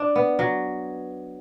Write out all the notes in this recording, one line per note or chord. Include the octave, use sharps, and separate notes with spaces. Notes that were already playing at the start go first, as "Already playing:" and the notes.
Already playing: D4
B3
F#3